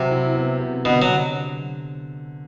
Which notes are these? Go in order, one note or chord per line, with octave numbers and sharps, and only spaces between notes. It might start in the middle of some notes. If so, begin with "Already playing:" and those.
Already playing: C3 F#3
E4
B3
C3
B2 D3
F#3